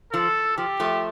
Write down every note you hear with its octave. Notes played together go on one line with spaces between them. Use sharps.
F3 A4
F3 G4
F3 A3